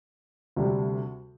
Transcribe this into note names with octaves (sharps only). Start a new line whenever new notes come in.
D2 C3 G3 D4 G4